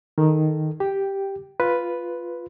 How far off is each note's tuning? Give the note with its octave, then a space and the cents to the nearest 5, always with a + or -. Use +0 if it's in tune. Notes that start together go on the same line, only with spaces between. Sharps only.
D#3 +0 A4 +0
G4 +0 G5 +0
F4 +0 B4 +0